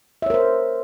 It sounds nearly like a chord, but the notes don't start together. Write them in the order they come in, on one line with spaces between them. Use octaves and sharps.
E5 C#5 A#4 C5